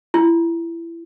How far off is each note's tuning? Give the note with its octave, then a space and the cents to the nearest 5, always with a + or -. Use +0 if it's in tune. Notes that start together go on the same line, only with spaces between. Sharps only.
E4 +25